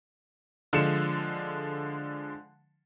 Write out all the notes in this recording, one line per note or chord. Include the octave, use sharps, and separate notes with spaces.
D3 F3 G#3 C#7 E7